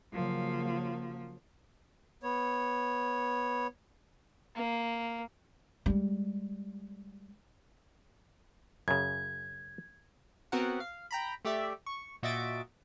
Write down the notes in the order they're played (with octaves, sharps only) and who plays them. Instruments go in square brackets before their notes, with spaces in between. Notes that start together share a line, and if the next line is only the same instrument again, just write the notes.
[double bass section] C#3 F#3 A#3 [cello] F3
[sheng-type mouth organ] B3 C#5
[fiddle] A#3
[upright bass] G3 G#3
[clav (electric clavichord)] F#2 C#3 [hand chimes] G#6
[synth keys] B3 C4 F#4 A#4 F#5
F5
G5 A#5 B5
A3 G4 D5 E5
C#6
A#2 F#4 D#5 E5 A6 D7